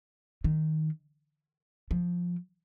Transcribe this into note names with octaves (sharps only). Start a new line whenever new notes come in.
D#3
F3